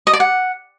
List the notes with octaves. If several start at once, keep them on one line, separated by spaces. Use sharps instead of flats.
D#5
D5
F#5